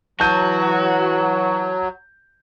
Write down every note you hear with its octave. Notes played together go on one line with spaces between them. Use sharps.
E3 F#3 F#4 A5 G6 D#7